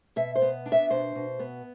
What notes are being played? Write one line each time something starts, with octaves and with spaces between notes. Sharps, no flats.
B2 E5
C5
B3
D4
E5
B2 C5
B2
B3